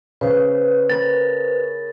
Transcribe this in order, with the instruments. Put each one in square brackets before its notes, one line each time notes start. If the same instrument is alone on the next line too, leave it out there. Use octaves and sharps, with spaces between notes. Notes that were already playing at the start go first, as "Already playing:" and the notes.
[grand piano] C#3 [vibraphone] B4 C5
[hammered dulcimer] A#4 B5 [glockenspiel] A6